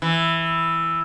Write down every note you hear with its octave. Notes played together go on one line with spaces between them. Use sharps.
E3